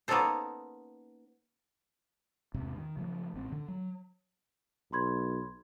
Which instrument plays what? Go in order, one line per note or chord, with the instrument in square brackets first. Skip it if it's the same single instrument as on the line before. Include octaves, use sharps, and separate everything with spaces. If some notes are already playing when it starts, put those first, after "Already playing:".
[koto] A#3 B3 C#4 D#4 A4 C5
[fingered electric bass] E2 G#2 C3
D#3
C#3 F3 A3
A1 C4
D3
F#3
[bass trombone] B1 [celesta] B5 C6 G#6